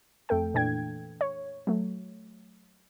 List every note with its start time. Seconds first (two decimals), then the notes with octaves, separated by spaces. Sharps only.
0.29 F2 A3 A4 G5
0.54 A#2 E3 D4 G5 G#6
1.21 C#5
1.67 F#3 A3